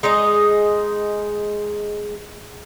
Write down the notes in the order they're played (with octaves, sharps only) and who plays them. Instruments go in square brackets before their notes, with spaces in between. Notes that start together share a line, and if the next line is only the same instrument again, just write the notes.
[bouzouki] G#3 D#4 G#4 D#5